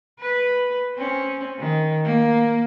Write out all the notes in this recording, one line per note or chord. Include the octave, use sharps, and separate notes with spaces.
B4
C4 C#4
D#3
A#3